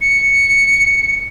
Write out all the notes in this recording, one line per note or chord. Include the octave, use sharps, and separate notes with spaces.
C#7